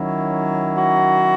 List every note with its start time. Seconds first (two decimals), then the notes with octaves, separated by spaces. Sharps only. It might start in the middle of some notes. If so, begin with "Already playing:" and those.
Already playing: D#3 F#3 C#4 E4
0.76 F#4